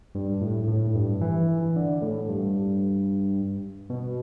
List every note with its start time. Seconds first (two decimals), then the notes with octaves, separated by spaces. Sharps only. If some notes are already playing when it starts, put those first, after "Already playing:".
0.15 G2
0.41 A2
0.68 A2
0.95 G2
1.21 E3
1.76 D3
2.02 A2
2.29 G2
3.90 B2